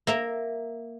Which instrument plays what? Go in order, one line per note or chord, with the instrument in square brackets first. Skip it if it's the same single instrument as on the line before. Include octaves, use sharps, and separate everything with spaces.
[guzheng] A#3 E5 A#5